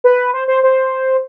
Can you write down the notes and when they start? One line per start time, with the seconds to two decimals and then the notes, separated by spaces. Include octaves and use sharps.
0.04 B4
0.34 C5
0.48 C5
0.63 C5